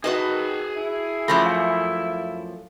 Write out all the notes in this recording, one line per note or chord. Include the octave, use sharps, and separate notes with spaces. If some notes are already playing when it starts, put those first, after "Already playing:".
D#4 F#4 G#4 B4 D#5 A5
E4
F#2 F3 A3 B5 A#6
F5